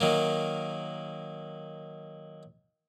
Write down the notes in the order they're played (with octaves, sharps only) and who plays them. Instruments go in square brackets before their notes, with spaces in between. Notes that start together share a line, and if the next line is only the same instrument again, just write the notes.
[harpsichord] D#3 F#3 A#3